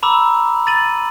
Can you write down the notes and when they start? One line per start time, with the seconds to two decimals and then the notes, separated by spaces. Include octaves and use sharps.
0.03 A#5 B5 D6 E6
0.66 B5 A6 D#7 F#7